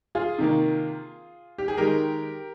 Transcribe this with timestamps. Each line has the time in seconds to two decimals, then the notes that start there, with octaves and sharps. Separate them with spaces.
0.15 F4 G#4
0.38 C3 D#3 A#3
1.58 G4
1.68 G#4
1.77 D#3 G#3 G4 A#4